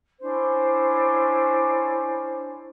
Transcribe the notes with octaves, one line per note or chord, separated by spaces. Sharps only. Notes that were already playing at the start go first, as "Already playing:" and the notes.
C#4 D4 E4 C5